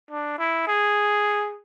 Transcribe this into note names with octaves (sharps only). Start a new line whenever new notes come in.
D4
E4
G#4